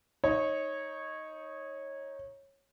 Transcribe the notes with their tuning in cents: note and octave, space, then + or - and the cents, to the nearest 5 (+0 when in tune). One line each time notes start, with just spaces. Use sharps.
D#4 +10 C#5 -15